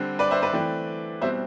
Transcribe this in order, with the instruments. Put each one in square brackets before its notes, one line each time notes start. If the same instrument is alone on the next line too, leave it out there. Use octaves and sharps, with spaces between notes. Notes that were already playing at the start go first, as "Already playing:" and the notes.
Already playing: [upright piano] D3 G3 C4
B4 D5
C5 E5
B4 D5
E3 A3 C4
B2 G3 C4 C5 E5